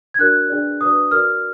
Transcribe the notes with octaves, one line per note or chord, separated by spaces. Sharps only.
G#6
D4 F#4 A#4 D5 F#6
D4 G#4 B4 D5
D4 F#4 B4 D5 D#6
F#4 A#4 D5 F6